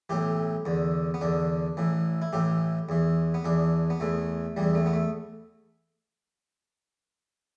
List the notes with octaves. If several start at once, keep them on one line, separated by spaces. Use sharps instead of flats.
B1 A2 E3 G4
E2 D3
B3
E2 D3 D4
A1 A2 E3
E4
A1 A2 E3 G4
E2 E3
B3
E2 E3 D4
B3
E2 E3 A3
E2 E3 G3
A3
B3
A3